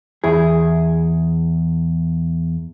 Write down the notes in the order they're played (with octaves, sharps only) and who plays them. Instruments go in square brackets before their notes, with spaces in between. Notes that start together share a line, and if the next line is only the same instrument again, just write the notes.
[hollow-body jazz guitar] E2 E4 G#4